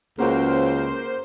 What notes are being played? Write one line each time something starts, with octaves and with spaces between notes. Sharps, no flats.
C#2 C#3 A#3 F#4 A#4 C5